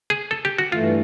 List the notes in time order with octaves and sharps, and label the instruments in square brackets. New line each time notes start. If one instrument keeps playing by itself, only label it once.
[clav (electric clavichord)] G#4
A4
G4
F#4
[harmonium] G2 E3 A3 [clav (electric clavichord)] F4